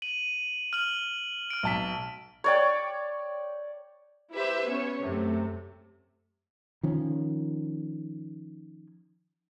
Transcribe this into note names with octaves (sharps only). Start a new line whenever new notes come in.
D#7 F#7
F6 F#7
F6 D7
B1 A5 B6
C#5 D5 G5
E4 G4 B4 C5 E5
B3 C#4 C#5
F#2 C3 A3
D#3 F3 C#4